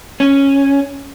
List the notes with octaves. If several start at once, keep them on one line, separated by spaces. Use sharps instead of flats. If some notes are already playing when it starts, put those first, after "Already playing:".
C#4